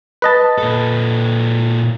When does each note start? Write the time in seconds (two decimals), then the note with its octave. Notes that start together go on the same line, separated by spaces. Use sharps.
0.22 B4 D#5 A5
0.58 A#2 A4